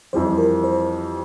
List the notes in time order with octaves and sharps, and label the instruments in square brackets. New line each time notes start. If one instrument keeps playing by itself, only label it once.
[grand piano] F2 E3 G3 C4 G4 [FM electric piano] C5
[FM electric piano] C5
A#4
C5